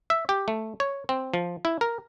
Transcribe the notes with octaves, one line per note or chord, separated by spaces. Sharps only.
E5
G4
A3
C#5
C4
F3
E4
A#4